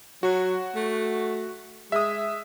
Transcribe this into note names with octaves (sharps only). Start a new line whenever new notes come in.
F#3 F#4
A3
G#3 E5 D#6